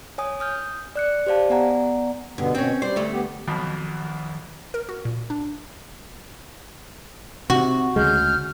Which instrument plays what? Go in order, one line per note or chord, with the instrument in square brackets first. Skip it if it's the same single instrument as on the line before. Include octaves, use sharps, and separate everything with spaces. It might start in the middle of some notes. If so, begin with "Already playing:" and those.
[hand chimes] C#5 G#5 D#6
D#6 F6 G6
D5 F#6 C#7
G4 C5 D5 F5 A5
B3 D5 F#5 G#5 A#5
[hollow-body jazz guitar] G2 [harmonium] B2 D3 B3
[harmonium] B2 [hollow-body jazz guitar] C4 C#4
[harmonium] G3 D5 [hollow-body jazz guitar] C5
[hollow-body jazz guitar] D2 A3
[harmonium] B3 G4
[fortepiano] B1 F2 B2 [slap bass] D#3 F3
[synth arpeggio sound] A#4
F#4
A#2
D4
[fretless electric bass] C3 [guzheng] F#4
[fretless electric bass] D2 C#3 G#3 [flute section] F6 G6